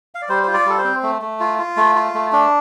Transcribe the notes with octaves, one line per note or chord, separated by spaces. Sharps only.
F5
D5
G3 C5
F4 C5
D5
G3 A4
C5
C4
A3
A3
F4
F4
A3
F4
A3
D4